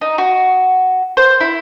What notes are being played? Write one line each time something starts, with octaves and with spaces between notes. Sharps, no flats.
D#4
F#4
C5
E4